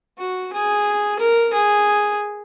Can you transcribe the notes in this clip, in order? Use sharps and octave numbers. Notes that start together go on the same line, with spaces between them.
F#4
G#4
A#4
G#4